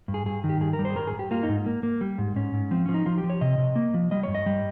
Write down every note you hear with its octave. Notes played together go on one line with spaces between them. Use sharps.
G2
G#4
G2 G#4
D#3
G4
G2 G#4
A#4
G3
C5
G#4
G2 A#4
G#4
G2
G4
A#3 F4
D#4
G#2
A#3
A#3
G3
G#2
G#2 C#4
G#2
F3 C4
F3 C#4
D#4
F3 F4
G4
F3
C#5
C3 D#5
C3
A#3
F3
G3 D#5
G2 C#5
D#5
G3